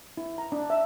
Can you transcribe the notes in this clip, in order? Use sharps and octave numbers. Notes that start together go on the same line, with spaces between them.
E4
A#5
D4
E5